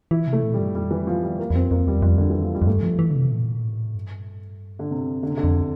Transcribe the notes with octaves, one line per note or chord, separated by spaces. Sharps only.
E3 E4
C3
A3
A#2
G3
G2
F2 G3
E3
F3
G3
A#3
E2
F2 C4
F2 A#3
E2 G3
F2 G3
D3
E3
F3
G3
F2
G2 A3
F3
E3
D3
C3
A#2
A2
G2
D3
C3
F2 D3
C3
D3
F2